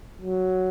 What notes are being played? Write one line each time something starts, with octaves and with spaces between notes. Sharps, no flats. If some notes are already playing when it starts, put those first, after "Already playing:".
F#3